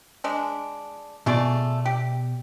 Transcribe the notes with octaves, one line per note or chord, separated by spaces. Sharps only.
G#3 D4
B2 A3 F4 G#4 D5
G4